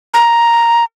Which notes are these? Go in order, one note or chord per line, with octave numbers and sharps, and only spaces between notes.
A#5